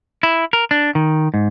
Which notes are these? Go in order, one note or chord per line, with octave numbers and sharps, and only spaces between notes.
E4
A#4
D4
D#3
G#2